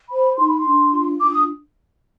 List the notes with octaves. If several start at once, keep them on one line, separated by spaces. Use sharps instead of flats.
C5 B5
D#4 C6
B5
C6
D4
F4
D4 D6
D#6